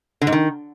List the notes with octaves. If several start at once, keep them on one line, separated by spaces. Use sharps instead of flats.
D3
G#2
D#3